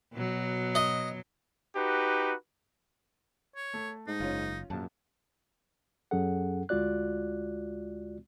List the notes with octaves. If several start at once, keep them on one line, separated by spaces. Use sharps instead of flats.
B2 F#3
D#5
D#4 F#4 G4 B4
C#5
A3
G#2 D#4
F#1 C#4 F4
A#1 F#2 A5
F#2 F#3 C#4 G#4 A4 F#5
D2 G#3 F4 F#4 D5 F#6